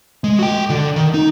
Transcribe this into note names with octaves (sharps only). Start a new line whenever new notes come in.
G#3
F#4 G5
D3
D#3
D#4